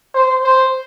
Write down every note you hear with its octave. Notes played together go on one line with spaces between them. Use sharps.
C5
C5